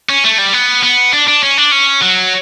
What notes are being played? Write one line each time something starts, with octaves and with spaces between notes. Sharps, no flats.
C#4
A3
G3
B3
B3
D4
D4
C#4
D4
C#4
F#3